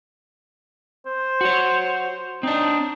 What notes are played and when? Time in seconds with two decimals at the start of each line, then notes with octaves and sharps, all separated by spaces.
1.06 C5
1.41 F#4 C#5
2.43 C4 D4 D#4